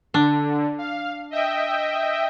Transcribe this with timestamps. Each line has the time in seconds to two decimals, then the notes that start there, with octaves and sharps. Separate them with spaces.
0.14 D3 D4
0.78 F5
1.31 D#5 E5 G5